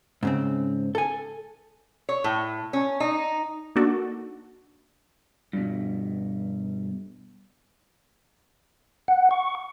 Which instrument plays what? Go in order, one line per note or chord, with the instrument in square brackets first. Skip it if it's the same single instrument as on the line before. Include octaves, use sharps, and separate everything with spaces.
[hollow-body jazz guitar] G#2 C#3 C4
A4 G#5
[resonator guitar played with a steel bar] C#5
A2
C#4
D#4
[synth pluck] A#3 D4 D#4 F#4 A4 D5
[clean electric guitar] G2 B2
[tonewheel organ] F#5
C#6